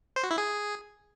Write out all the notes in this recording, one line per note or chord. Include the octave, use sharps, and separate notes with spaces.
C5
F#4
E4
G#4